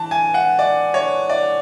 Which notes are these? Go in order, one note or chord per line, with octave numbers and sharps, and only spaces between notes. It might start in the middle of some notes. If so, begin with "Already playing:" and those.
Already playing: E3 A5
G#5
F#5
D5
C#5
D5